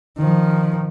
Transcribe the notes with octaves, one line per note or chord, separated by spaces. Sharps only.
D#3 F3